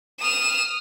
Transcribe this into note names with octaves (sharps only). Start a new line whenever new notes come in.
D#6 F6 E7